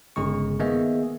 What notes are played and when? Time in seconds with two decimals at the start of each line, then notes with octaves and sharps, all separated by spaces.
0.16 G1 C#3 G#3 C#6
0.59 D#3 A#3 B3 G#4 D#5 E5